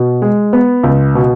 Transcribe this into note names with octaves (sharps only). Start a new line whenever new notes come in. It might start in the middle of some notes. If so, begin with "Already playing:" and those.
Already playing: B2
G#3
B3
C#2
B2